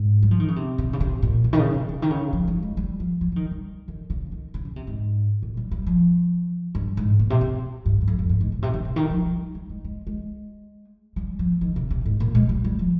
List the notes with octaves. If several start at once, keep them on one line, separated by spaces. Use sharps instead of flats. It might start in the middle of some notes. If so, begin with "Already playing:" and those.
Already playing: G#2
G3
F3
D#3
C#3
C3
C3
C#3
C3
A#2
A#2
D#3
C#3
C3
C#3
D#3
C#3
F3
G3
G#3
G3
F3
F3
F3
D#3
G3
D#3
C#3
D#3
C#3
C#3
C3
G#2
A#2
G3
G3
F3
G2
G#2
A#2
C3
C3
G2
G2
F2
F2
G2
G#2
A#2
C3
D#3
C3
D#3
F3
G3
G3
G#3
G#3
G#3
G3
F3
D#3
C3
C3
G#2
A#2
G#3
G3
G3
F3